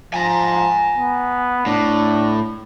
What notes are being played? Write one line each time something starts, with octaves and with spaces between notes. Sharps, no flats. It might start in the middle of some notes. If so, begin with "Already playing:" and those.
F3 G#5 A#5
B3
A2 D4